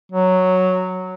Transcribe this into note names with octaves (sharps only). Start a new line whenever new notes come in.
F#3